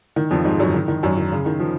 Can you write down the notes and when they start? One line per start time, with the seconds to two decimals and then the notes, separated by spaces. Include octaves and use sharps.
0.16 D#3
0.31 F2 F3
0.45 G#2 G#3
0.59 F#2 F#3
0.74 D#3
0.88 D#3
1.03 F#2 F#3
1.18 D#3
1.32 C#3
1.46 D#3
1.60 F3